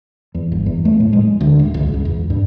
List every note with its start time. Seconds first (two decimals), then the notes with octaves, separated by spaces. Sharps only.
0.34 E2
0.52 G1
0.66 E2
0.85 A3
1.00 A2
1.13 G#3
1.41 D2
1.59 D#1
1.74 C#2
1.94 C#2
2.05 E2
2.30 G2